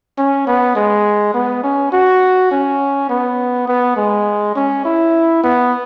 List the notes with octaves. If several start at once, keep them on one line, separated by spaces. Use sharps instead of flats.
C#4
B3
G#3
B3
C#4
F#4
C#4
B3
B3
G#3
C#4
E4
B3